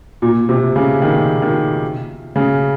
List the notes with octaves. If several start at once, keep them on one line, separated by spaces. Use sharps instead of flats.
A#2
C3
C#3
D#3
D#3
C#3